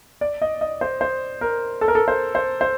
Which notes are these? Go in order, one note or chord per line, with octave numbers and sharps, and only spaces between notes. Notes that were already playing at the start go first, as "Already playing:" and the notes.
D5
D#5
D#5
C5
C5
A#4
A4
A#4
A4
C5
C5
C5